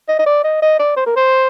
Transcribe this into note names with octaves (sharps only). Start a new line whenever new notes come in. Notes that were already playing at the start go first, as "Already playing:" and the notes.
D#5
D#5
D5
D#5
D#5
D5
C5
A#4
C5